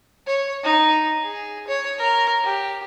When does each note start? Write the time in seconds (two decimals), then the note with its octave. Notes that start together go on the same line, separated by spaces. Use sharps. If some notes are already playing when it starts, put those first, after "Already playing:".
0.27 C#5
0.64 D#4
1.24 G#4
1.67 C#5
1.98 A#4
2.44 G4